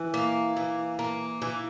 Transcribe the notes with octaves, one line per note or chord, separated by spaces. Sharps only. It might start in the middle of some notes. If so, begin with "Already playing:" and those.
Already playing: E3
A#3
E3
A#3
E3